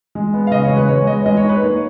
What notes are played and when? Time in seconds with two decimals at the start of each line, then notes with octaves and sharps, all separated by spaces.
0.15 G#3
0.34 B3
0.47 F5
0.51 C#3 D#5
0.64 C#5
0.69 G#3
0.77 B4
0.88 G#3 C#5
1.07 B3 D#5
1.26 G#3 D#5
1.37 C#5
1.44 D#4
1.49 B4
1.61 A#3 C#5